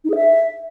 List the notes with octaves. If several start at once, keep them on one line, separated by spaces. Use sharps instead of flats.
D#4
G#4
E5